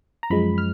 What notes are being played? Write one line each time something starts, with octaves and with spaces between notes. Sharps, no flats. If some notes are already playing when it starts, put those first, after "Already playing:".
A#5
F#2 F3 G#3 B5
F6